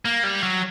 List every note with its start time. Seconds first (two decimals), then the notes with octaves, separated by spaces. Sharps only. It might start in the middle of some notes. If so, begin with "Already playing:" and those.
0.05 A#3
0.23 G3
0.42 F#3